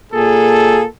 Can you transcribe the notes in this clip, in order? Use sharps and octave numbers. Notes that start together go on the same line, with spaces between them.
A#2 A#3 G#4 A4